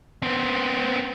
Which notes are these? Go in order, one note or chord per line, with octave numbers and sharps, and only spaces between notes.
B3 C4